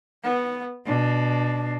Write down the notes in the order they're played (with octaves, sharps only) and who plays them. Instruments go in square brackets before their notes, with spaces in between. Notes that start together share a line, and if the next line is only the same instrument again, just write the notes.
[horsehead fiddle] B3
[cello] B2 [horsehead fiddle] D4